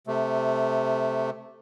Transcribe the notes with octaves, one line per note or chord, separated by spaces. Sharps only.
C3 A3